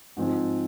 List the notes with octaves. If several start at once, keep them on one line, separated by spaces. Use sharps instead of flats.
G#2 F3 C4